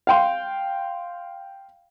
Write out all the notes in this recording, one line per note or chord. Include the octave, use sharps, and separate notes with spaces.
F5 G5 C6